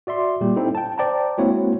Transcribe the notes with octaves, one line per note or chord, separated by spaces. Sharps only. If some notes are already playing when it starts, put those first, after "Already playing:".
F#4 D5 E5 C6
A#2 G3 G4
C4 D#4 E4 A4
G5 A5
C5 D5 G5 A5 A#5
G#3 A#3 C4 E4 F#4 C#5